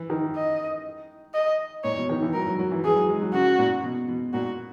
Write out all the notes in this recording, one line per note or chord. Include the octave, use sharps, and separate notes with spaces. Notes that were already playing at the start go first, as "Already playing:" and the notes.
Already playing: E3
D#3
D#5
D#5
A#2 C#5
B2
D#3
E3
F#3 A#4
F#3
F#3
E3
E3 G#4
F#3
G#3
F#3
C#3 F#4
A#2
B2
B2
A#2 F#4